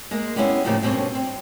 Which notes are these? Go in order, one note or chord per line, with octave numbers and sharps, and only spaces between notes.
G#3 A#3
G3 G#3 B3 C#4 E4
A2 C#3 F3 A#3 D#4 G4
G2 B2 C4 C#4 C#5
C4